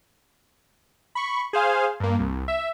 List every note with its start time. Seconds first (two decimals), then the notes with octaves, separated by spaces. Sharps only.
1.15 B5 C#6
1.53 G#4 C5 F5 G#5
2.00 G2 A#3
2.19 C2
2.48 E5